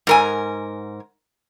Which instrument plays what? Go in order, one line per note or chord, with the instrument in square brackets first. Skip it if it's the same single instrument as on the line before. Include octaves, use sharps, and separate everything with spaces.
[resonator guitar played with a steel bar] G#2 A#4 G#5